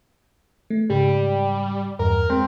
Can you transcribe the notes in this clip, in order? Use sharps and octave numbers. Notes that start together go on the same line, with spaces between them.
A3
G#2 C#3 G3
E2 G2 A#4
G#3 C4